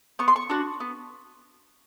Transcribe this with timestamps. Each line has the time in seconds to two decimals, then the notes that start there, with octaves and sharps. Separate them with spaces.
0.19 B3 C#6
0.28 C6
0.36 C#6
0.50 D4 F#4
0.80 B3